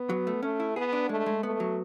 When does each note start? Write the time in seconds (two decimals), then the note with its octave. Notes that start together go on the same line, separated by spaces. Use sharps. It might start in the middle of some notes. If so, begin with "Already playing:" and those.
Already playing: B3
0.10 F#3
0.27 A3
0.43 A3 C#4
0.60 E4
0.76 B3 G#4
0.93 D4
1.09 G#3 A3
1.26 G#3
1.43 A3 B3
1.60 F#3